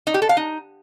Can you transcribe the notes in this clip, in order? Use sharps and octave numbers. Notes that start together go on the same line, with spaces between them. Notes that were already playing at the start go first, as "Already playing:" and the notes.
D#4
G4
A4
F5
D#4